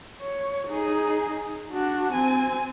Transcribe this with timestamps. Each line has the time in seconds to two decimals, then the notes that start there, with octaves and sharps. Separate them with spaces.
0.21 C#5
0.68 D#4 G#4
1.71 D4 F#4
2.12 C4 G#5